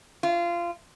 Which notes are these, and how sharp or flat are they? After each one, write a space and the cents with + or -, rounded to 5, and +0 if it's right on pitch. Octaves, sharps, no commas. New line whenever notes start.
F4 -20